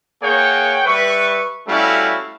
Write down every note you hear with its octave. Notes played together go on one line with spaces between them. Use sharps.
A#3 G#4 C#5 F#5 G5
G3 B4 E5 C#6
G3 A3 C#4 E4 F#4 F5